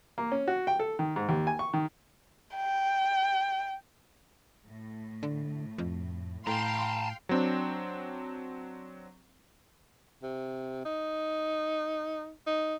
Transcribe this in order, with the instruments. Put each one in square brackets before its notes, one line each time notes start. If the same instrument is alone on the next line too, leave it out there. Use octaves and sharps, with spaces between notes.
[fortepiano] A#3
C#4
F#4
G5
A4
D#3
G#2
D#2
G#5
C#6
D#3
[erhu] G5
[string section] A2
[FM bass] D3
F2
[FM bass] A2 [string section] F5 G5 C6 [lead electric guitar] A5 A#5
[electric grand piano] F#3 C4 D4
[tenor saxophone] C3
D#4
D#4